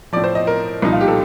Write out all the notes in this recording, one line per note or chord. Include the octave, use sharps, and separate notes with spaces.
A2 F3 D5
C5
D#5
A#4
C2 A#2 F3 D#4
F4
G4
A4